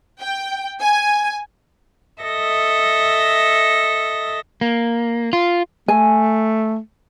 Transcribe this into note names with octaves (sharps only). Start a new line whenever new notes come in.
G5
G#5
A4 D#5 E5 A#6
A#3
F4
A3 G#5